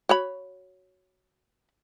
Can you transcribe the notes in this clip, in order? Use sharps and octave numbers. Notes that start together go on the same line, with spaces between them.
F#4 C#5 B5